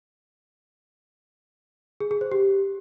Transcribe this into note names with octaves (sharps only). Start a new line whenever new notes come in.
G#4
G#4
C5
G4